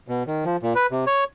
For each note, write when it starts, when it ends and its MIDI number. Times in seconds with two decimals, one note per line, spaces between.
0.08 0.23 47
0.27 0.44 51
0.45 0.57 53
0.63 0.73 46
0.75 0.86 71
0.91 1.05 48
1.07 1.24 73